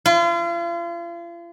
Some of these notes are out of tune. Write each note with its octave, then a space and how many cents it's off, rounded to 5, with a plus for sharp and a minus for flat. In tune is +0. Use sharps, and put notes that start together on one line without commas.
F4 -40